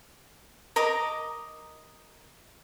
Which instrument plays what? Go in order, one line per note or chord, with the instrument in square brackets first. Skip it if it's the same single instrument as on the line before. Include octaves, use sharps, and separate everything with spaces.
[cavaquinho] A#4 D#5 A#5 D6